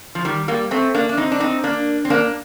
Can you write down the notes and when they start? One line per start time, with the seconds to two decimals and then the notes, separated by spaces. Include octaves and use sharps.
0.15 F3
0.25 D#3 G3
0.48 G3 A#3
0.71 A3 C4
0.94 A#3 D4
1.09 D4
1.17 C4 D#4
1.32 D4
1.40 C4 D#4
1.64 A#3 D4
2.05 C4
2.10 A#3 D4